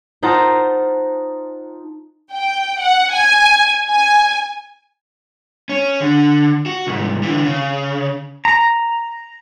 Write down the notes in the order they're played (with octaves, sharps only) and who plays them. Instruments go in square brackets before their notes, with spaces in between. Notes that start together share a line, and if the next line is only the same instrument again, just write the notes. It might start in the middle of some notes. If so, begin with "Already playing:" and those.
[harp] D#4 F4 C5 F#5 A5 A#5
[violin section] G5
F#5
G#5
G#5
[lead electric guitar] C#4
D3
F#4
C2 G#2
D3 E3
C#3
[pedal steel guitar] A#5